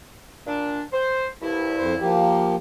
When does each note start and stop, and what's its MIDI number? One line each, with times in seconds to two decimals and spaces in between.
0.47 0.81 46
0.47 0.81 62
0.93 1.27 72
1.42 2.15 36
1.42 2.15 43
1.42 2.15 64
1.78 1.95 41
1.78 1.95 72
2.01 2.56 53
2.01 2.56 58
2.01 2.56 67